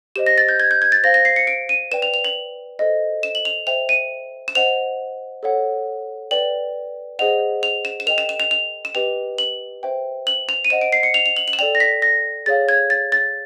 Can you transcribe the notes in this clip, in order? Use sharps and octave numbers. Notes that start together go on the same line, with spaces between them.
G4 C5 D#5 E7
A#6
A6
G6
G#6
G6
G#6
A6
C5 F5 A#6
A#6
C7
C#7
D7
D#7
B4 D5 G5 E7
F7
F7
F#7
A4 C5 D#5
E7
F#7
F7
C5 E5 G5 F7
D#7
E7
C5 D#5 F#5 F7
A4 C#5 F#5
B4 D5 G5 F#7
G#4 C5 D#5 F#5 F7
F7
E7
E7
A#4 D#5 G5 F7
E7
E7
F7
F7
E7
G4 B4 D#5 G5 F7
F#7
C5 E5 G5
F#7
F7
D#7
C5 D#5 F#5 E7
D7
C7
C#7
F7
F7
F#7
F#7
E7
A4 D5 G5 F7
A#6
B6
A#6
G#4 C#5 F5 A6
G#6
A6
A6